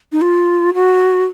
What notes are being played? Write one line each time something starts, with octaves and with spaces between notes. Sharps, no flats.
D#4
F4
F#4